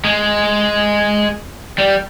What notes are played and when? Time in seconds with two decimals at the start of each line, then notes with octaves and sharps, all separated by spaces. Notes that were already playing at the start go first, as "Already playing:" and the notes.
0.05 G#3
1.78 G3